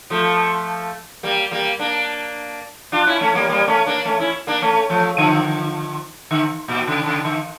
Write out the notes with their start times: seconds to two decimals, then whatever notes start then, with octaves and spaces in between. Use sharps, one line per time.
0.10 F3 A3
1.23 G3 A#3
1.51 G3 A#3
1.79 A#3 D4
2.92 D4 F4
3.07 C#4 E4
3.21 A3 C#4
3.35 G3 A#3
3.49 G3 A#3
3.67 A3 C#4
3.86 A#3 D4
4.05 A3 C#4
4.19 C#4 E4
4.47 A#3 D4
4.62 A3 C#4
4.89 F3 A3
5.18 D3 F3
6.31 D3
6.68 A#2
6.88 C#3
7.06 C#3
7.25 D3